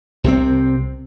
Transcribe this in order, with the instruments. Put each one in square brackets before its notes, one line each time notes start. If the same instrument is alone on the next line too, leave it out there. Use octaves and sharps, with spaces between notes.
[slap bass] C2 C3 E3 C4